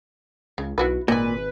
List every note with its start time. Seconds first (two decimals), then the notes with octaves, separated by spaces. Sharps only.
0.58 C#2 C#3
0.78 B1 E4 F#4 B4
1.08 G#1 A#2 B4 D#5 G#5